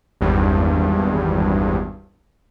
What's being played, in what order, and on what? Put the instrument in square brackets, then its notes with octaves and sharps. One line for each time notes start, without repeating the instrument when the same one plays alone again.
[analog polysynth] G#1 E2 G2